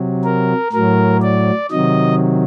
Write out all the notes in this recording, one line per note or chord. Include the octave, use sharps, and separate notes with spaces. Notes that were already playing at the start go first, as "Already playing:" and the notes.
Already playing: C3 F#3
A#4
A2 F#3 A#4
D5
C3 D#3 F#3 D#5